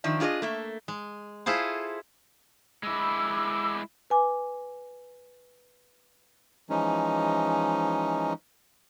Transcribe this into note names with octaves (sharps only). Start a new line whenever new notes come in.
D#3 F3 D4 E5
D4 F4 G#4 C#5 D#5
A3 A#3 E5
G#3
E4 F4 G#4 A4 C5
G#3 E4 B5 D6 E6
B4 G#5 D6
E3 F3 G#3 C#4 D#4